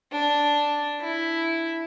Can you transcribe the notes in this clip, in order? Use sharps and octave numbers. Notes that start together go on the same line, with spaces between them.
D4
E4